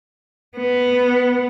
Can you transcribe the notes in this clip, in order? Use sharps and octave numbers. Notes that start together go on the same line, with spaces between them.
B3